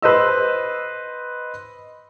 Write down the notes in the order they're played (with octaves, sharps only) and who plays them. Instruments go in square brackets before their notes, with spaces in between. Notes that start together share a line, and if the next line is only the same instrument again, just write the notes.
[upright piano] B4 C5 D#5 E6